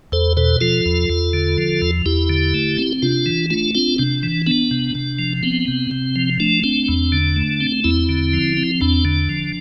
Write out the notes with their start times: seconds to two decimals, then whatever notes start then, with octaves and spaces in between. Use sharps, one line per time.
0.12 E2 A4 C5
0.37 B2 A4 C5
0.61 F3 F4 A4
0.86 E2
1.10 E2
1.33 D3
1.58 F3
1.82 E2
2.06 E2 E4 G4
2.30 D3
2.54 A3
2.78 C4
3.02 C3 D4 F4
3.26 E3
3.50 A3 D4 F4
3.75 C4 D4 F4
3.98 C3 D4
4.23 E3
4.46 B3 D4
4.71 C3
4.95 C3
5.19 F3
5.43 B3 C4
5.68 C3
5.91 C3
6.16 F3
6.40 A3 D4
6.64 C4 D4
6.88 E2
7.12 D3
7.36 A3
7.60 C4
7.84 E2 C4 E4
8.09 D3
8.33 F3
8.57 C4
8.81 E2 D4
9.05 D3
9.29 F3